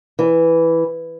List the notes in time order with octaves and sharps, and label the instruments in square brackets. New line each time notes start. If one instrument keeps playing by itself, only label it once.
[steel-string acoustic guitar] E3